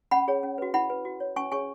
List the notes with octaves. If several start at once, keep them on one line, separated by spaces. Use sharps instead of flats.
C#4 F#5 B5
G#4 C#5
C#4
F#4 B4
E4 F#5 B5
B4
F#4
C#5
C#4 G#5 C#6
G#4 C#5 G#5 C#6